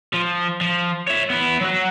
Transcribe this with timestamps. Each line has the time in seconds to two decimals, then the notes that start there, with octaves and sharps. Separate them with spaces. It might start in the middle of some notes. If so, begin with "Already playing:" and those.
0.13 F3
0.61 F3
1.07 C#5 E5
1.30 B3 E4
1.61 F#3 F#4